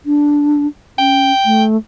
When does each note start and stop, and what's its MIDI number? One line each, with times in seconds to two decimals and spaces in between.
0.06 0.67 62
0.98 1.32 61
0.98 1.63 79
1.45 1.77 57